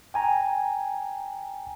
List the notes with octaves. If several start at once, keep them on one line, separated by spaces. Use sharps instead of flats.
G5 G#5 A#5